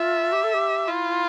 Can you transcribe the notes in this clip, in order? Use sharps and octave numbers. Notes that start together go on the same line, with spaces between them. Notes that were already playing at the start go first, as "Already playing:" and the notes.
Already playing: F4 E5
G4
A4
G4
E4 F4